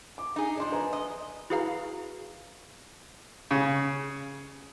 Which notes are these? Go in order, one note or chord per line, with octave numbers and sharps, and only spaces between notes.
D6
D#4 G#4
F3 D4 D#5 C6
B4 G#5 A#5
D#5
E4 F#4 G#4 B4 F5 A#5
C#3